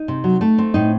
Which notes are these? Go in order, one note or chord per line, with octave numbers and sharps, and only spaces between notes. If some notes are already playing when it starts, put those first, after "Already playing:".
Already playing: D#4
C3
F#3
A3
C4
A2 D#4